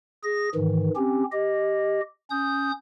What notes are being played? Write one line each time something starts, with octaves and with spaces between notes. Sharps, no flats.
G#4 A#6
G#2 D#3 E3
C4 C#4 G4
G4 D#5
C#4 D#6 G6